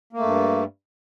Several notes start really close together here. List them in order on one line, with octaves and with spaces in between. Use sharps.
A#3 A3 G2